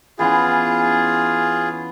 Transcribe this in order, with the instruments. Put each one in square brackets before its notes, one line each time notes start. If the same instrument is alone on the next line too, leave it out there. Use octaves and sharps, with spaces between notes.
[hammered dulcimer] E3 B3 C#4 [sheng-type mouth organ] F4 G#4